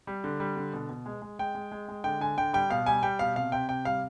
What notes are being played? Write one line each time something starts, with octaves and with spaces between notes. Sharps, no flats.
G3
D3
G3
D3
B2
B2
G#3
G#3
G#3 G5
G#3
G#3
G#3
D3 G5
D3 G#5
D3 G5
G3 G5
B2 F5
G3 G#5
G3 G5
B2 F5
C3 F5
C3 G5
C3 G5
G3 F5